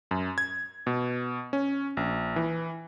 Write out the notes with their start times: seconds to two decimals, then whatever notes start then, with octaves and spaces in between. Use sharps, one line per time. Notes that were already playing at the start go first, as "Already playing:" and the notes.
0.11 F#2
0.38 G#6
0.87 B2
1.53 C#4
1.97 A#1
2.36 E3